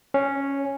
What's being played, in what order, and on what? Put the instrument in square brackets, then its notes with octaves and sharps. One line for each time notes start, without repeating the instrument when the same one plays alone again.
[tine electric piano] C#4